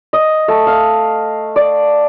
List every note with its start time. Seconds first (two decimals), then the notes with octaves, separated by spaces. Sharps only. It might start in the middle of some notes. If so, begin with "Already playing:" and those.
0.13 D#5
0.48 A3
0.67 F5
1.56 D5